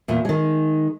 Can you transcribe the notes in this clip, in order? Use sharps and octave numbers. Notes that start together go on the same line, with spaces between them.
E2 A#2
D#3 G#3